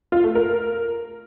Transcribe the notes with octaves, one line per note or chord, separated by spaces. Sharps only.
F4
A3
A#4